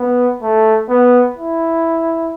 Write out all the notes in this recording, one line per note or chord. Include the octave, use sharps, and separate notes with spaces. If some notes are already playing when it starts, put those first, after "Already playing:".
Already playing: B3
A3
B3
E4